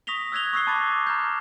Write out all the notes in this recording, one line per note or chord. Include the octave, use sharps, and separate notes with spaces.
C#6 D#6 A#6 B6 F7 G7
E6 F#6 G#6 A#6 F7 G7
C#6 D#6 E6 F#6 C7 G7
A5 B5 C#6 D6 A6
A#5 F6 G6